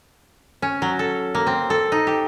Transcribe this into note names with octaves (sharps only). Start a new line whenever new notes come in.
C#4
F#3
A4
A#3
C4
A4
D#4
G4